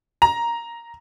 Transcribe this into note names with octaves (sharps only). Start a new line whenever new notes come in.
A#5